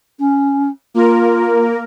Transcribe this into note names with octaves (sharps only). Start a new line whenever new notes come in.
C#4
A#3 F4 A#4